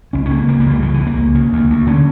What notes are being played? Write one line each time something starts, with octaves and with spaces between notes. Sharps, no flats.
C#2 C#4
C#4
C#2 A#3
C#3 A#3
A#3
C#2 G3
C#3 F3
E3
C#2
A#3
C#2
C#3
D2
D2
D3 C#4